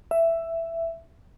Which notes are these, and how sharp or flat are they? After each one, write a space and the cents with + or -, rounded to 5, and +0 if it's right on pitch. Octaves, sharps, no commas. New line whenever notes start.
E5 +10